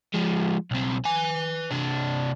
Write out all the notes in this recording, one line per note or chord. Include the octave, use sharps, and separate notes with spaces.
F3 G#3
B1 C4
B4 G#5
C2 D4